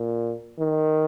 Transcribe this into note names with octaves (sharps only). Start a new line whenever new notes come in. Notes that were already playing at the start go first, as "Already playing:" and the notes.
Already playing: A#2
D#3